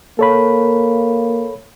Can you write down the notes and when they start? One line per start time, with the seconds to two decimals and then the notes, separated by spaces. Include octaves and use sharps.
0.19 A#3 A4 C#5 B5